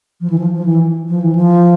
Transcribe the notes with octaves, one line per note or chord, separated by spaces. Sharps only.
F3
E3
F3
F3
E3
F3
E3
F3